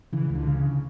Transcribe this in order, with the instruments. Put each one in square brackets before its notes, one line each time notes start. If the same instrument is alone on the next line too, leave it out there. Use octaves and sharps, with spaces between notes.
[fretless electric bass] C#3 E3
C#2
D3
C#3